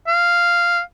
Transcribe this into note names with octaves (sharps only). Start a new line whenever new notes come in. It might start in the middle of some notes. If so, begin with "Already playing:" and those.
F5